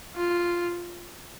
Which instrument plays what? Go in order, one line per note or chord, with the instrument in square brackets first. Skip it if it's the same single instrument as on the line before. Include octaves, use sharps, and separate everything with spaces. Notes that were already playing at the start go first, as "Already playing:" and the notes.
[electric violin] F4